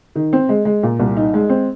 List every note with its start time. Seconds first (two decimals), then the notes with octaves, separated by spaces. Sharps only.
0.16 D#3
0.33 C4
0.49 G#3
0.65 G#3
0.83 A#2
1.00 C2
1.17 D#4
1.34 G#3
1.49 C4